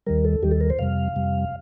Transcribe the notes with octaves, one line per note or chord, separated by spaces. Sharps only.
D#2 D#3 G3 A#4
A4
D#2 D#3 G3 G4
A4
A#4
C5
F2 C3 G3 F5
F2 C3 G3